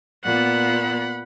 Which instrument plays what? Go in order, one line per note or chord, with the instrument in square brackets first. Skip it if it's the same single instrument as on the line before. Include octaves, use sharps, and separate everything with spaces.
[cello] A#2 B3 [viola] F#5 B5